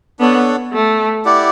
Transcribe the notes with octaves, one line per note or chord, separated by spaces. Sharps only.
B3 D4 A4 C#5 F#5
A3
E4 G4 D5 F#5